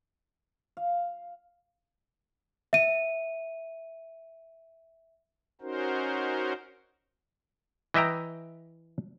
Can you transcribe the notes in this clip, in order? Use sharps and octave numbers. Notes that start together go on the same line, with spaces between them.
F5
E5 D#7
C#4 D#4 F#4 A#4 C5
E3 D#5 E5 G5 A#5